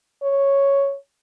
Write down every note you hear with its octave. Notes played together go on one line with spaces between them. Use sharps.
C#5